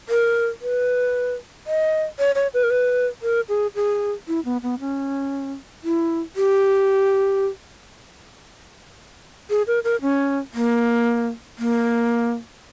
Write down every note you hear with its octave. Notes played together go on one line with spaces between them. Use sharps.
A#4
B4
D#5
C#5
C#5
B4
A#4
B4
A#4
G#4
G#4
E4
B3
B3
C#4
E4
G4
G#4
A#4
A#4
C#4
A#3
A#3